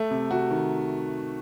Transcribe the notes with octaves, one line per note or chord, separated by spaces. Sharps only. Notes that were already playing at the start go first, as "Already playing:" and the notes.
Already playing: A3
C3
C3 F#4
D#3